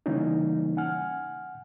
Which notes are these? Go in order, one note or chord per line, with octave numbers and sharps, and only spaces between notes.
C#3 E3 G3 A#3 C#4 D#4
F#5 G#5 F6